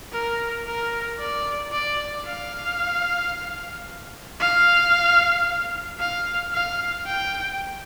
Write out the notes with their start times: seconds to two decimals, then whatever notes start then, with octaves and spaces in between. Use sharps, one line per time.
0.12 A#4
0.67 A#4
1.19 D5
1.73 D5
2.26 F5
4.40 F5
6.00 F5
6.53 F5
7.06 G5